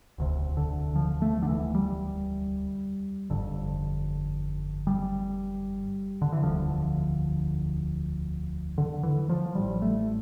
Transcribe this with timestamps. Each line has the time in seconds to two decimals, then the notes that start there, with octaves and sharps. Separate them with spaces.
0.18 E1 D2 C3
0.57 D3
0.96 F3
1.22 A3
1.42 D3
1.49 E3
1.75 G3
3.30 G1 F2 D3
4.87 G3
6.22 D3
6.33 E3
6.43 E1 D2 D3 F3
8.78 D3
9.03 E3
9.29 F3
9.55 A1 A2 G3
9.82 A3